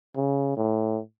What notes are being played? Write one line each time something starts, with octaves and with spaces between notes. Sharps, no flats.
C#3
A2